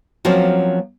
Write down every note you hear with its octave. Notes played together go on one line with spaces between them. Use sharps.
F3 F#3 A#3 C4 C#4